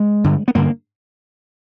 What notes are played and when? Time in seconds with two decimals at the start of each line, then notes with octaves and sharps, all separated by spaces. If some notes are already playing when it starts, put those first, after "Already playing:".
Already playing: G#3
0.24 G2 D3
0.48 B3
0.55 G2 D3 A#3